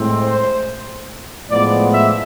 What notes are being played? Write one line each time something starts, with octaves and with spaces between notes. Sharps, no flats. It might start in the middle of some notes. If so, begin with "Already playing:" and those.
Already playing: A2 G#3 C4
C5
A2 F3 G#3 B3 D5
E5